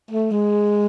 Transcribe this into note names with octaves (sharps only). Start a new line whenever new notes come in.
A3
G#3